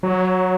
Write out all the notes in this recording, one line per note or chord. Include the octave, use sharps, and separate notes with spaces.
F#3